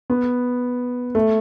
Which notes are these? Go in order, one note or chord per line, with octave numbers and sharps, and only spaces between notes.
B3
A3